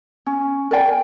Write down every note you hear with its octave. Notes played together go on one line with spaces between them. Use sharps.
C#4
A#4 D5 G5 G#5